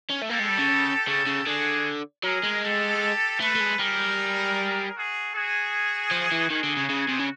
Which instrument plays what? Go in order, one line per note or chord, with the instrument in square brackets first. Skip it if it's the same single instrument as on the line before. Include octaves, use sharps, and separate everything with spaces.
[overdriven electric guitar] C#4
A3
[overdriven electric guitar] A#3 [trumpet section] G4 A4
[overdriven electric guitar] G#3
G3
C#3
[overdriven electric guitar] C#3 [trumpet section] G4 A4
[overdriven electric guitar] C#3
[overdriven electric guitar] D3 [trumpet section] F#4 G#4
[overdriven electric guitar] F#3 [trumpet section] G#4 A#4
[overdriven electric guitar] G#3
[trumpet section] G4 A4
[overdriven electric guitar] A3 [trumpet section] A4 B4
[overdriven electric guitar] A3
G#3
[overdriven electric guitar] G3 [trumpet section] G#4 A#4
[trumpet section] F#4 G#4
F#4 G#4
[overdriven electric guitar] F3
E3
[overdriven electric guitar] D#3 [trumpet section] F#4 G#4
[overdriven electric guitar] D3
C#3
C#3
C3
C#3